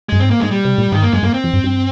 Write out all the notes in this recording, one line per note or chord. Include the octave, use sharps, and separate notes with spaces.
G2 G#3
G#2 C4
A#3
G#2 G#3
A#2 G3
C3
A#2
G#2 D#3
G2 A#3
G2 G#3
G2 A#3
C4
F2
G2
G2